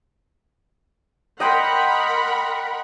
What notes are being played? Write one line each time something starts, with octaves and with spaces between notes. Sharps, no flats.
A#4 D#5 F#5 G5 B5 C6